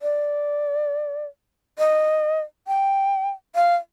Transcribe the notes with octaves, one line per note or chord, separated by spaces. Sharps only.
D5
D#5
G5
F5